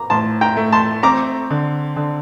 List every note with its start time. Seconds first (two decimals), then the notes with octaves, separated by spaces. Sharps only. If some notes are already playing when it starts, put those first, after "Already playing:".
Already playing: A#5 D6
0.10 A2 A5 C6
0.41 G5 A#5
0.57 A3
0.72 A5 C6
1.03 C4 A#5 D6
1.50 D3
1.96 D3